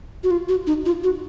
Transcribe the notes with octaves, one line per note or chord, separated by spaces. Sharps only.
F#4
F4
F#4
D#4
F4
F#4